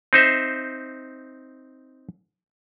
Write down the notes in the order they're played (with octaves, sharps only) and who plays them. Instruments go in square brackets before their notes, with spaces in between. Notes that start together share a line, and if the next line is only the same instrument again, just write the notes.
[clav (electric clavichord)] C4 D#4 C5 E5